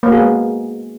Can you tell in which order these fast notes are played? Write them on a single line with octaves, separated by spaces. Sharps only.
A#3 F#4 G#4 B3 G#3